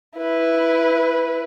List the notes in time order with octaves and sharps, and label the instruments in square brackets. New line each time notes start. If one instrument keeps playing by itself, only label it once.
[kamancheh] E4 B4